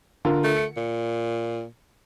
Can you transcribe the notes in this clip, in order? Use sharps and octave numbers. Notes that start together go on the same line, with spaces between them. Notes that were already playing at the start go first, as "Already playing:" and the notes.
D3 F4 A#4
A3
C#7
A#2